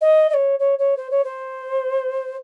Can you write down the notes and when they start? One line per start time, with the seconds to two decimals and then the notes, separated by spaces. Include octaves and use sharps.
0.01 D#5
0.29 D#5
0.34 C#5
0.59 C#5
0.79 C#5
0.97 C5
1.11 C#5
1.24 C5